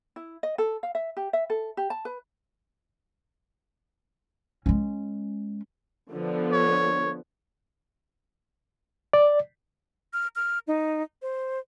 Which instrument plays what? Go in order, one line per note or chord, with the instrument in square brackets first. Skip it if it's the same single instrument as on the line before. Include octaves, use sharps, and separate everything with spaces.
[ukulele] E4
D#5
A4
F5
E5
G4
E5
A4
G4
A5
B4
[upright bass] G#3 C#4
[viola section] D3 F3 B3
[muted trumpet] C#5
[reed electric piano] D5
[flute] F6
F6
D#4
C5